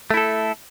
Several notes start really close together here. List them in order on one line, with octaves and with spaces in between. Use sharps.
A3 E4 A4